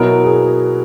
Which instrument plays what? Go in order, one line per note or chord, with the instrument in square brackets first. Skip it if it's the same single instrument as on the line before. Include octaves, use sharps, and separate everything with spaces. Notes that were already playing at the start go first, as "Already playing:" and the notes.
Already playing: [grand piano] B2 F#3 B3 E4 A#4
G#4